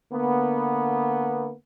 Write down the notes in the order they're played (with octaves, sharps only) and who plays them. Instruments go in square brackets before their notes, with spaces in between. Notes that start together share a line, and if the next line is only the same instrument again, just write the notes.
[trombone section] D3 A#3 B3